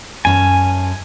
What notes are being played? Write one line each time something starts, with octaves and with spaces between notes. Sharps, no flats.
F#2 C#4 G#5 A5